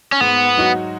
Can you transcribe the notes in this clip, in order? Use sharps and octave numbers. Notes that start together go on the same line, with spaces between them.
C#4
G#2 B3
F#3 D#4 F#4